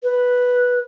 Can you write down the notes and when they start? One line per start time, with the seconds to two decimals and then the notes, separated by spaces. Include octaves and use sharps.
0.03 B4